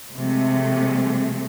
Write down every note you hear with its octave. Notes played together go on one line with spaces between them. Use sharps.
C3 F3 G#3 A3